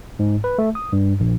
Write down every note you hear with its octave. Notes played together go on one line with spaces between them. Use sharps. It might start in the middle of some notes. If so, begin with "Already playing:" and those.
G#2
B4
A3
D#6
G2
A#1